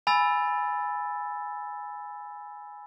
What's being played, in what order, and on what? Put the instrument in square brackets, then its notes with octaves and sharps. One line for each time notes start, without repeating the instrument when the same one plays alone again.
[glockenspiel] G#5 B5 E6 A6